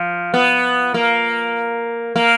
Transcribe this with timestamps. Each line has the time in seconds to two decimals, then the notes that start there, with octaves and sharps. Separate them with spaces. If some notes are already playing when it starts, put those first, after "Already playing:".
Already playing: F3
0.34 B3
0.94 A#3
2.16 A#3